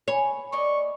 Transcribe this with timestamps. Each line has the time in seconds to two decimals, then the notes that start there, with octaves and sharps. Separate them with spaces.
0.08 C#5 G#5 B5
0.52 A#3 D5 D#5 C#6